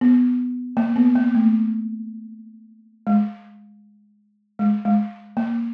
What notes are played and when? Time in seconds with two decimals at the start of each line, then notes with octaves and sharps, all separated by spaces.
0.01 B3
0.77 A#3
0.96 B3
1.16 A#3
1.35 A3
3.07 G#3
4.59 G#3
4.85 G#3
5.37 A#3